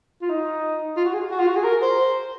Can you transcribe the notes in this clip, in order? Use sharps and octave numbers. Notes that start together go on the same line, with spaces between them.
F4
D#4
F4
F#4
G#4
F#4
F4
F#4
G#4
A#4
C5